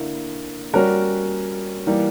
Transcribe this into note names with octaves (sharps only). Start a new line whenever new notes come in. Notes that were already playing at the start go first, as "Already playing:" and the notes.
Already playing: D3 A#3 E4
G3 C#4 F#4 A#4
E3 G3 A#3